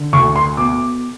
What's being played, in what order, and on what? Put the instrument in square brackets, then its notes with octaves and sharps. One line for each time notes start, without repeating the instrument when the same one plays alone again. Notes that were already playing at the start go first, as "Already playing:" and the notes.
Already playing: [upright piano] D3
D2 C#6
C6
B2 D6